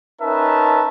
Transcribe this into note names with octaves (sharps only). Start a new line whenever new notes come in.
C#4 D#4 A#4 B4 E5 A5